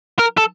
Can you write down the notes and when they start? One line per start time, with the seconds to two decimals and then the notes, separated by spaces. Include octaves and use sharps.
0.19 A#4
0.38 A4